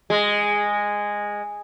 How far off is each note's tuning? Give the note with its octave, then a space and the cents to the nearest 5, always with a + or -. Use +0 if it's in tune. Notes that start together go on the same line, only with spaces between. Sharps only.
G#3 -10